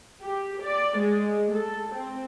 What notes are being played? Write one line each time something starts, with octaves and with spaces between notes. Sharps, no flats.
G4
D5
G#3
A4
C4